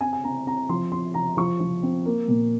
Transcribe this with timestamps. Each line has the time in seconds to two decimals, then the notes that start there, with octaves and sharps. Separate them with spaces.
0.01 C4 G#5
0.13 G#5
0.24 C4 A#5
0.46 C4 A#5
0.69 F3 C6
0.92 C4 C6
1.14 F3 A#5
1.37 F3 C#6
1.60 F3
1.83 C4
2.06 A#3
2.28 A#2